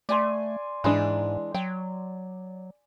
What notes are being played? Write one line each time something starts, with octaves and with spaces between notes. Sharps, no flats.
A3 D5 G#5 C6
G#2 E3 G#3 D4
F#3 G5